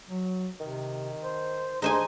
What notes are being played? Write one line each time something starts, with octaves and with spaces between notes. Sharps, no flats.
F#3
C3 D#3
C5
G#2 D4 D#4 C5 G#5